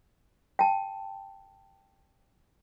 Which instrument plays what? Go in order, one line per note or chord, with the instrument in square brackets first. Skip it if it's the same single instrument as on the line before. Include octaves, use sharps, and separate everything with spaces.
[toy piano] G5 A5